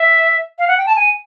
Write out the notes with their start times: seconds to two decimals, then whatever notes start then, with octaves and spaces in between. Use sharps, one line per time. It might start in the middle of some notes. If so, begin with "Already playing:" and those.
Already playing: E5
0.59 F5
0.68 F#5
0.78 G5
0.86 A5
0.96 G#5